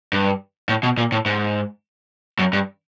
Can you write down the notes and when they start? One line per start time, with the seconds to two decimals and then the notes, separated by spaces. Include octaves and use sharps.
0.13 G2
0.69 A2
0.83 B2
0.97 A#2
1.12 A2
1.26 G#2
2.39 F#2
2.53 G2